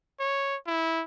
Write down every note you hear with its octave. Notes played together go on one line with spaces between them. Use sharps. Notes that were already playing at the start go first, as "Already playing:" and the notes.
C#5
E4